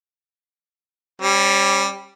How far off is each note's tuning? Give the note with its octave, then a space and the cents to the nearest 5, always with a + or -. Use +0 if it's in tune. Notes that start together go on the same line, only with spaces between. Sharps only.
G3 +0 C#4 -35